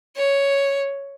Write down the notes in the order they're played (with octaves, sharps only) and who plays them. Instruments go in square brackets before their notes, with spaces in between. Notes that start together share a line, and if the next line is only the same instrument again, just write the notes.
[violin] C#5